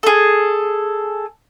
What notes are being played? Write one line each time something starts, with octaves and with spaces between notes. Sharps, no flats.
G#4 A4